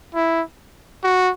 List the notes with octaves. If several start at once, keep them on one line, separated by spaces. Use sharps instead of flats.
E4
F#4